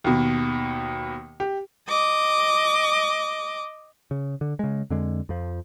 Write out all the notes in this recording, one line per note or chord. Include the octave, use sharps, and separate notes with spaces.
D#2 B2
G4
D#5 D6
C#3
D3
C#3 G#3
F2 D3 G#3
F2 F3